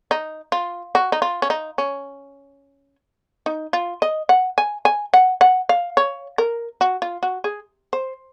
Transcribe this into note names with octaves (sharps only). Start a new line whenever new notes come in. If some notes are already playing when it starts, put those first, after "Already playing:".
D#4
F4
F#4
D#4
F4
C#4
D#4
C#4
D#4
F4
D#5
F#5
G#5
G#5
F#5
F#5
F5
C#5
A#4
F#4
F4
F#4
G#4
C5